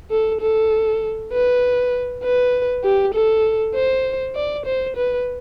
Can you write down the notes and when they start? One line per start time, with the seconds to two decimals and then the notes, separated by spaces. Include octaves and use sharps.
0.11 A4
0.41 A4
1.32 B4
2.23 B4
2.84 G4
3.14 A4
3.75 C5
4.35 D5
4.66 C5
4.96 B4